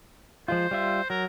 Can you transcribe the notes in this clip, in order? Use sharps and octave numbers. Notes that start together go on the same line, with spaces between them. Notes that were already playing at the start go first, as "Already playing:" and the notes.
F3 G#3 F4 C5
G3 F4 E5
F#3 A#4